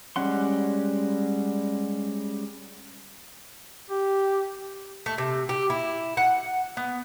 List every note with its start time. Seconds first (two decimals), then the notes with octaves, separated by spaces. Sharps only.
0.16 G3 G#3 C#4 F#5 C6
3.90 G4
5.06 A3
5.18 C3
5.49 G4
5.70 E4
6.17 F#5
6.77 B3